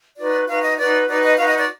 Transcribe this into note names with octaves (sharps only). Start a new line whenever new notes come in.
D#4 F#4 B4 D5
D#4 F#4 B4 F5
D#5
D#4 F#4 B4 D5
D#4 F#4 B4 D5
D#5
D#4 F#4 B4 F5
D#5
D5